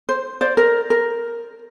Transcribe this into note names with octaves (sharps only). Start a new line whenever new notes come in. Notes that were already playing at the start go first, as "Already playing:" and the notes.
C5
C5 D5
A#4
A#4